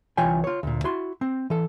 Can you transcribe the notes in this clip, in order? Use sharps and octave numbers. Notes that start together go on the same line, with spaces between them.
C2 E3 F4 C#5 G5 G#5
F4 C#5
D2 A#2
E4 F#4 C6
C4
E3 A4